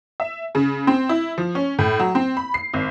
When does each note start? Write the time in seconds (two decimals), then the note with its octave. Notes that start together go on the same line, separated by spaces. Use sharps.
0.20 E5
0.55 C#3
0.87 C4
1.09 E4
1.38 F3
1.55 C#4
1.79 A2
1.99 F#3
2.15 C4
2.37 B5
2.54 C7
2.74 G#1